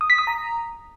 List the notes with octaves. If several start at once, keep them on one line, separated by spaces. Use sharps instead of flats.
D#6
B6
D#6
A#5